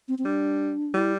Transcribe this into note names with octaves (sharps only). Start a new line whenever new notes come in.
C4
C4
G3 D4
G3 E4